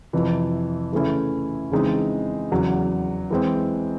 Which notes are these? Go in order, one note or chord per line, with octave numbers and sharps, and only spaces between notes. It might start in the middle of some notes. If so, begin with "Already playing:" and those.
F2 C3 E3
C#3 E3 A3 C#4 E4
C#3 E3 G#3 C4 D#4
E2 C#3 F#3
E3 G#3 C4